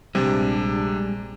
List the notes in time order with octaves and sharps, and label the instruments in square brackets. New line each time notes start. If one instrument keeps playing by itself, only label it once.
[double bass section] A#1 [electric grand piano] C3 [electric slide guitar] G3 G#3 [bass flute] D4